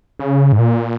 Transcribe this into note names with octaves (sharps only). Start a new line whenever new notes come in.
C#3
G#2
A#2